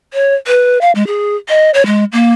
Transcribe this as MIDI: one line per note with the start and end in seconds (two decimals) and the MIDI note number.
0.14 0.35 73
0.47 0.80 71
0.81 0.91 77
0.95 1.06 56
1.07 1.36 68
1.49 1.71 75
1.74 1.85 73
1.86 2.04 56
2.13 2.33 58